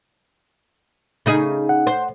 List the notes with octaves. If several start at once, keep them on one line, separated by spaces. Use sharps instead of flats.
C#3 D#4 G#4
F#5
C5